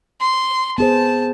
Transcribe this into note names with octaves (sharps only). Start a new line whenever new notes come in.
C6
B3 G#4 C5 A5